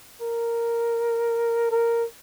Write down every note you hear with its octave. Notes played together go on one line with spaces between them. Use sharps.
A#4
A#4